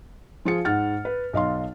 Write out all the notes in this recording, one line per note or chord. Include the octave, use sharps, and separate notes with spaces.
F3 F4 G#4 C#7
G#2 F#5 F6 A6
B4
B1 D#5 F5 C6